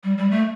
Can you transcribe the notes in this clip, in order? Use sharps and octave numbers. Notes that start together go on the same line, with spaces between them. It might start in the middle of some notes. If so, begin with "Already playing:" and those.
G3
G3
A3